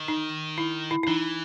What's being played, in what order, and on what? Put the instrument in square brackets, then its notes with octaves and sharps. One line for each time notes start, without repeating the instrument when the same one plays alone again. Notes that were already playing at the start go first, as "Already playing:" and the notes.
Already playing: [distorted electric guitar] D#3
[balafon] D#4
E4
E4
E4
[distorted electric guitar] E3 [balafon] D#4